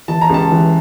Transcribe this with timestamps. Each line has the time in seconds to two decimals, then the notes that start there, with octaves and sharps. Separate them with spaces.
0.08 E3 A5
0.21 A#5
0.29 C#2 A5
0.51 E3